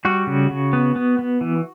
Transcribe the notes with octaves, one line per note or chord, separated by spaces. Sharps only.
G3 F#4
C#3
C#3
B3
B3
B3
E3